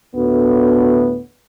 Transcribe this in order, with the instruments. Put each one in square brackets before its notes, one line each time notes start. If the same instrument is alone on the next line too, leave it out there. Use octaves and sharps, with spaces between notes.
[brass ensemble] D2 A2 B3